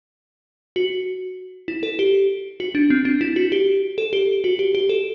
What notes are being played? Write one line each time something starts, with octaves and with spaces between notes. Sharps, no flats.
F#4
E4
A4
G4
F#4
D4
C4
D4
E4
F#4
G4
A4
G4
F#4
G4
G4
A4